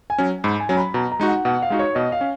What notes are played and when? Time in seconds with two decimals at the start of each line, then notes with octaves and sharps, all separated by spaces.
0.10 G#5
0.18 F#3 C#4
0.44 G#2 B5
0.60 G#5
0.69 F#3 C#4 A#5
0.77 B5
0.94 B2 A#5
1.12 A#5
1.20 G#3 D#4 F#4
1.28 F#5
1.45 B2 F#5
1.62 F5
1.70 G#3 D#4 F#4
1.79 C#5
1.95 B2 D#5
2.12 F5
2.21 C#4